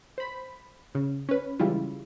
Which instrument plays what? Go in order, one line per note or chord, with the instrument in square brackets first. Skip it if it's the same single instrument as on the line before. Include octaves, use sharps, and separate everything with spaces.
[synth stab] C5 B5
C#3
C#4 B4
C#3 E3 G3 G#3 E4 F4